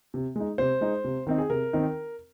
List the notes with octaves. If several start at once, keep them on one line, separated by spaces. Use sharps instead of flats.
C3
G#3 D#4
C3 C5
G#3 D#4
C3
D#3 C4 D#4
G#4
C3 A#4
D#3 C4 D#4